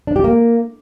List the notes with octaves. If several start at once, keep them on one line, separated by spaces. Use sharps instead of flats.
D4
G4
A#3